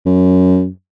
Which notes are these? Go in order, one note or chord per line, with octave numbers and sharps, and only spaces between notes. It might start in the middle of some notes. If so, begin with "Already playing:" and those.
F#2